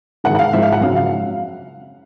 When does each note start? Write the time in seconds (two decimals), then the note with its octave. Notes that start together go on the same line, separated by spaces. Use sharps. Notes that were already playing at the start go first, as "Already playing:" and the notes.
0.24 G#2 D#3 G#3 F#5
0.35 F#5
0.39 F5
0.53 G#2 F3 G#3 E5
0.62 F5
0.72 F#5
0.81 F#2 C#3 F#3 F5
0.96 F5